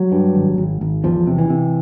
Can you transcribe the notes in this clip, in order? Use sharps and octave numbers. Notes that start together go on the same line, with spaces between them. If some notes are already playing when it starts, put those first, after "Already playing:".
Already playing: F#3
G2
G#1
G#1
G#1
E2 F3
C3
E3
C3